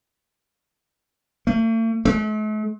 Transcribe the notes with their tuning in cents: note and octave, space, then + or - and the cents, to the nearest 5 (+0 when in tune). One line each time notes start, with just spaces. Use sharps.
A3 +45
A3 -45